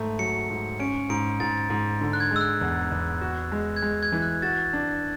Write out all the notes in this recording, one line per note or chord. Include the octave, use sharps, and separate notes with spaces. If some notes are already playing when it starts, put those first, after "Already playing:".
Already playing: G#2 A3
F#3 C#7
G#2
C#4 D7
G#2 D7
G#2 A6
G#2
D3
F#6
G#6
G#3 E6
F#6
E2
E2
F#4
G#3
G#6
G#3 F#6
G#6
E3
F#6
F#4 A6
D4